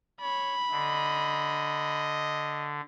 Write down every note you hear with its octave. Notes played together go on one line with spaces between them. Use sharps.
C#5 B5
D3 D#5